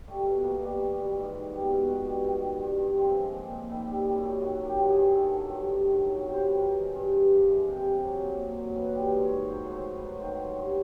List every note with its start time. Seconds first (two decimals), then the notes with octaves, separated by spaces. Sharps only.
0.08 G3 A3
0.25 B2
0.43 B2 A#3
0.62 G3
0.81 E3
0.98 G3
1.17 G#2
1.35 G#2
1.52 G3 B3
1.70 B2
1.88 B2
2.07 G3
2.24 D#3
2.43 G3
2.60 G2
2.79 G2
2.97 F3 C4
3.15 G#3
3.33 A#2
3.51 A#2
3.69 D#3 E4
3.87 G3
3.93 E4
4.06 F#2
4.18 E4
4.24 F#2
4.42 D#3 F#4
4.60 F#3
4.66 G4
4.78 G2
4.90 G#4
4.96 G2
5.14 D#3 A4
5.33 F#3
5.50 G2
5.68 G2
5.86 D#3
6.05 F#3
6.22 C3
6.34 C5
6.40 C3
6.46 B4
6.58 E3 A#4
6.77 G#3
6.95 G2
7.12 G2
7.31 F3
7.50 G#3
7.68 C3
7.86 C3
8.03 F#3
8.21 A#2
8.39 A#2
8.58 F#3
8.76 E3 B4
8.93 G3
8.99 C5
9.11 G#2
9.24 C#5
9.30 G#2
9.48 F#3 C5
9.66 A2
9.72 C5
9.84 A2
9.96 B4
10.02 F#3
10.20 D#3 C5
10.39 F#3
10.56 G2